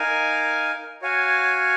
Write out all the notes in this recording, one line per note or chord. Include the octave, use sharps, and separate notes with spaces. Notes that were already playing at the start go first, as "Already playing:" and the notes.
Already playing: D#4 A#4 F5 G#5
F#4 C#5 F5 G#5